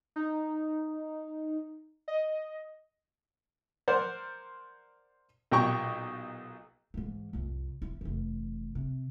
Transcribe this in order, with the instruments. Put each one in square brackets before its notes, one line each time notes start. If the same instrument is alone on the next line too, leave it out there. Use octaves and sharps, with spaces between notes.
[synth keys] D#4
D#5
[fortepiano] A#4 C5 D5 F#5
B1 A#2 G4 G5 A#5 C#6
[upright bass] G#2 E3
C2 F2
E4
F1 E3
C3